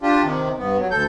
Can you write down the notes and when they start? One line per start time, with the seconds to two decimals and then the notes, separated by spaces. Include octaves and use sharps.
0.01 D4 F4 G4
0.23 C3 D#3
0.58 G2 B3
0.79 F#3
0.91 D2 A4 G6